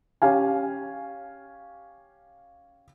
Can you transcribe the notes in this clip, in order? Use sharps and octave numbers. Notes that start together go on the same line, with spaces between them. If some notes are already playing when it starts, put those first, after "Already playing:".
C#4 G4 F5 G#5